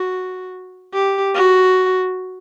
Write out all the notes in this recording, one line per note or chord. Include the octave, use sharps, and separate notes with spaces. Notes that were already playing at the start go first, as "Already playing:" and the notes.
Already playing: F#4
G4
F#4